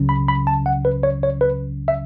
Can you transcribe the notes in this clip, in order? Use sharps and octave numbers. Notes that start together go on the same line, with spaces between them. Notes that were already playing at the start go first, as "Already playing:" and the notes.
Already playing: C#2 C#3 F#3 C#4
B5
B5
A5
F#5
B4
C#5
C#5
B4
E5